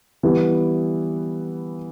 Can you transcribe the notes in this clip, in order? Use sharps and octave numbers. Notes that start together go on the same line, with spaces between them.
E3 G3 B3